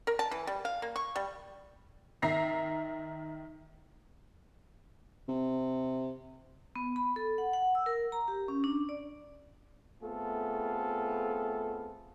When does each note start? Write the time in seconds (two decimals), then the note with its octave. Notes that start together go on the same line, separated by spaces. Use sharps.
0.07 A#4
0.19 A5
0.31 E3
0.47 G3
0.65 F5
0.82 A#3
0.96 C#6
1.16 G3
2.22 D#3 E5 A#5 A#6 C7
5.28 C3
6.76 B3
6.96 B5
7.16 A4
7.38 F#5
7.53 F#5
7.75 E6
7.86 A#4
8.12 A#5
8.28 G4
8.48 C#4
8.64 D4
8.89 D5
10.02 A3 B3 C4 F4 G#4 A4